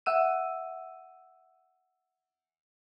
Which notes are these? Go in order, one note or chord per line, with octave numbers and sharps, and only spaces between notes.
E5 F#5 E6 D#7